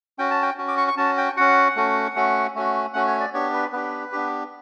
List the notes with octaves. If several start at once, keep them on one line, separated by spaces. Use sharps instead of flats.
C#4 F#4 G5
A5
G5
C#4 F#4
D6
C#6
C#6
C#4 F#4 A5
G5
C#4 F#4 F#5
A3 C#4 F#4
A3 C#4 F#4
A3 C#4 F#4
A3 C#4 F#4 F#5
C#5
D5
B3 D4 G4 C#5
B4
B3 D4 G4 B4
B3 D4 G4